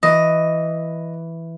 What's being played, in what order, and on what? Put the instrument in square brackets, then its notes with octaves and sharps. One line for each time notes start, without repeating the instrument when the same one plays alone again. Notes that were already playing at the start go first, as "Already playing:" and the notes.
[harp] E3 [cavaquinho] D#5